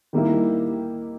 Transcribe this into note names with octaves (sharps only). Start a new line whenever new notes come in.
D#3 G3 A#3 E4 G4